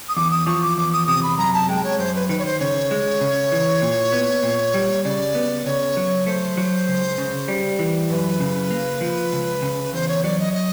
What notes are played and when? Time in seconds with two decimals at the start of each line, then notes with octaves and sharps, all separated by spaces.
0.09 D#6
0.16 E2 D6
0.31 D#6
0.47 F3 C#6
0.62 D6
0.77 E2 D6
0.93 D#6
1.07 C3 D#6
1.23 B5
1.38 F#2 A#5
1.54 A5
1.69 G#3 G5
1.83 C#5
1.99 F#2 C5
2.15 B4
2.29 D#3 B4
2.38 C#5
2.45 C5
2.60 C#3 C#5
2.91 G#3
3.21 C#3
3.52 E3
3.82 A#2
4.12 B3
4.43 A#2
4.74 G3
5.04 C#3 D5
5.35 B3
5.65 C#3 C#5
5.97 F#3
6.27 A3 C5
6.57 F#3
6.88 C#2
7.18 C#3
7.48 G3
7.79 E3
8.10 F#2 B4
8.40 C#3
8.70 A#3
9.01 F3
9.32 C#2
9.62 C#3
9.93 E2 C5
10.08 C#5
10.23 F#3 D5
10.39 D#5
10.53 D#5